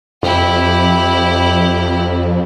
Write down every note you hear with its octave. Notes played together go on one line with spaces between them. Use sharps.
F2 E4 G4